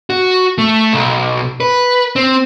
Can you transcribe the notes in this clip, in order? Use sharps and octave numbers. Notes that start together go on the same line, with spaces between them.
F#4
A3
B1
B4
C4